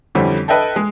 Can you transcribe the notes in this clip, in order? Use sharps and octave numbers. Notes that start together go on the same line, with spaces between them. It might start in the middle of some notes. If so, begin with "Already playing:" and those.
F2 D3 E3 G3 C4 C#4
A4 B4 D#5 E5 G5 A5
G#3